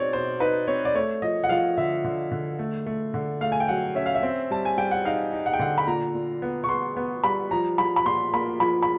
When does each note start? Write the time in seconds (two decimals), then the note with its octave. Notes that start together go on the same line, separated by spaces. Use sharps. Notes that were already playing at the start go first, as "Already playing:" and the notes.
Already playing: B2 C4 D#4 C#5 D5
0.13 B2 C5
0.40 D#4 B4
0.68 C4 C#5
0.85 D5
0.95 A3 C#5
1.22 F3 D#5
1.44 F#5
1.49 F3 F5
1.77 D3 E5
2.04 D3
2.31 D3
2.59 A3
2.86 A3
3.14 D3
3.41 A3 F5
3.52 G#5
3.60 G5
3.68 F#3 F#5
3.95 C#4 E5
4.06 F5
4.15 E5
4.23 C4
4.51 G3 A5
4.65 G#5
4.78 G3 G5
4.91 F#5
5.05 D#4 F5
5.32 D#4
5.46 F#5
5.53 G5
5.59 D3 F#5
5.78 B5
5.87 A#2 A#5
6.14 A#2
6.42 B3
6.64 C#6
6.69 B3 C6
6.97 B3
7.24 G3 B5
7.51 F3 A#5
7.78 F3 B5
7.96 B5
8.06 A#2 C6
8.33 A#3 B5
8.60 F3 B5
8.83 B5